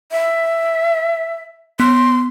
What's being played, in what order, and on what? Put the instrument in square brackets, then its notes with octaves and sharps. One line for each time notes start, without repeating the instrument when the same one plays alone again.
[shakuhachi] E5
[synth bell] B3 [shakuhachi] C6